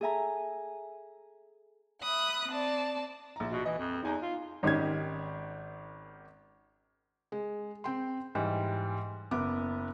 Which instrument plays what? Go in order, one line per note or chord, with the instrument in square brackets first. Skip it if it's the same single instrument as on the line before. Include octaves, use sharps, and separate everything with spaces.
[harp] G#4 A4 E5 G#5 A#5
[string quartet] E5 B5 D#6 F#6
C4 D5 A5
[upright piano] A#1 A#5
[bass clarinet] B2
[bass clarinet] E3 [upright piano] D#5
[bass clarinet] F2
[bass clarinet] E2 [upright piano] D#4 G#5 A#5
[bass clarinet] F4
[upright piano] G#1 D#3 C#4 G4 G#6
[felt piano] G#3
C4 G5 C6
G#2 E3 G3
F#1 B3 D6